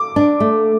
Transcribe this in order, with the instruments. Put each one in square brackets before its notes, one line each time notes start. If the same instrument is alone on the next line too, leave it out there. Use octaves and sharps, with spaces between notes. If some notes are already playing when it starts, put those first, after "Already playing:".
Already playing: [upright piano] D6
[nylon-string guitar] D4
A3